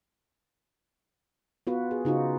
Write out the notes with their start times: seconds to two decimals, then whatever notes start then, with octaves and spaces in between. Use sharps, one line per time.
1.67 B3 F4 F#4 B4
1.91 G#4
2.05 C#3 D#4 F4 F#4